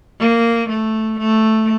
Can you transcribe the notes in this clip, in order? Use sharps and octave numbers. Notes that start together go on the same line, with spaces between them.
A#3
A3
A3